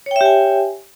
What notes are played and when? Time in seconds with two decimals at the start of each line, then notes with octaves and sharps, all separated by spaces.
0.06 C#5
0.11 G5
0.16 E5
0.21 G4
0.26 G#5